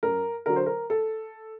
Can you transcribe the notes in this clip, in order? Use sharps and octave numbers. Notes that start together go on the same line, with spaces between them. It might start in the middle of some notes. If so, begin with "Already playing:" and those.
F#2 A#4
D3 F#3 A#4
C5
A#4
A4